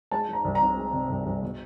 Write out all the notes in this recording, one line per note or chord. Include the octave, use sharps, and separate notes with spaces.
G#3 A5
G#3
A#5
C2
A#5
C3
G#3
C3
C2
C2
B2